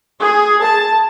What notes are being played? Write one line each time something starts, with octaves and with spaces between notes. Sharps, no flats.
G#4
A5